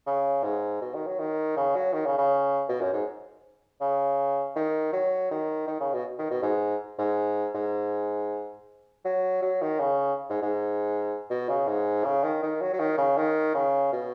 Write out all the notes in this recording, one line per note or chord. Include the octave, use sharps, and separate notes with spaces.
C#3
G#2
B2
D#3
F#3
D#3
C#3
F#3
D#3
C#3
C#3
B2
F#2
G#2
C#3
D#3
F#3
D#3
D#3
C#3
B2
D#3
B2
G#2
G#2
G#2
F#3
F#3
D#3
C#3
G#2
G#2
B2
C#3
G#2
C#3
D#3
D#3
F#3
F#3
D#3
C#3
D#3
C#3
B2